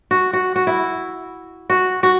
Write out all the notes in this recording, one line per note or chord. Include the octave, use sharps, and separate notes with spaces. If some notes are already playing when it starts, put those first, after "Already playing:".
F#4
F#4
F#4
E4
F#4
F#4